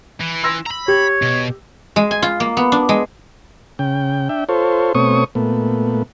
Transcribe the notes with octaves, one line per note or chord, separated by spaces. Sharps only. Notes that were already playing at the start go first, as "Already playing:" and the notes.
E3
C6 E6 A#6
A#5 B5
G4 C#5
B2
G#3
G#5
F4
A#3
B3
D4
G#3
C#3 G5
D4 E5 G5
F4 A4 C5 C#5
B2 A3 C4 C#5 C#6 D#6
A#2 A3 B3